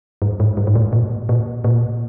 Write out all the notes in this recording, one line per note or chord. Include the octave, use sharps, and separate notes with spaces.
G2
G#2
G2
G#2
A2
A#2
A#2
A#2